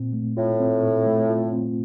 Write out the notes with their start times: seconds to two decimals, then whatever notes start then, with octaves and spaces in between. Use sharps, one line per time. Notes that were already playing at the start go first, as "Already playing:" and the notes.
Already playing: A#2 C4
0.13 A3
0.37 A2 F4
0.60 C4
0.83 A#2
1.06 A3
1.29 F4
1.53 C4